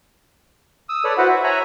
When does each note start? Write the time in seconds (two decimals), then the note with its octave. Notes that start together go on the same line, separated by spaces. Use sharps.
0.89 D#6 E6
1.04 A4 B4 C#5 D5
1.17 E4 F#4 B4 C5 F#5
1.29 E5
1.44 C#5 E5 G#5 A#5 B5